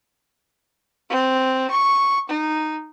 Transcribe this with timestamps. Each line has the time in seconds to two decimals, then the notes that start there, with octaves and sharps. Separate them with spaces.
1.10 C4
1.70 C#6
2.29 D#4